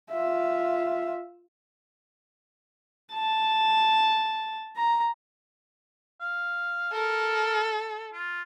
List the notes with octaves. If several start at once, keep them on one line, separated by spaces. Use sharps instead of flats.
F4 E5
A5
A#5
F5
A4 A#4
F4